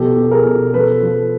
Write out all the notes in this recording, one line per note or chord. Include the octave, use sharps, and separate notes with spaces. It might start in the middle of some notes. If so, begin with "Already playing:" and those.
Already playing: B2 F3 G4 A4
B2
G#4 A#4
B2
F3 A4 B4
F3